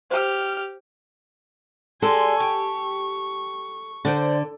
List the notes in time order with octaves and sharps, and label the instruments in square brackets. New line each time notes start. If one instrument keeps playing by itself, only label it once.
[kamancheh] G4 F6 [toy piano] C5
[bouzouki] G#3 G4 D5 [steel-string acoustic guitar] A4 [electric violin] G#5 C6
[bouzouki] G4 [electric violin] C#6
[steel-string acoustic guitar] D3 [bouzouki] C5 D5 F#5